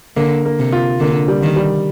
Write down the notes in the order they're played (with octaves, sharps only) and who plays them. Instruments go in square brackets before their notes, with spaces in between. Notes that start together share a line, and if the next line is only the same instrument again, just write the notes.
[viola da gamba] D3 [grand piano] A#3
[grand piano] A#3
[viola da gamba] C3
[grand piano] F4
[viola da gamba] D3 [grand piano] A#3
[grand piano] G3
[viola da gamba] D#3
[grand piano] G3